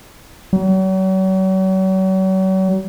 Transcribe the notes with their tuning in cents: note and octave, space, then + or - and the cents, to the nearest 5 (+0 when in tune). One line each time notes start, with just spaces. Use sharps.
F#3 +40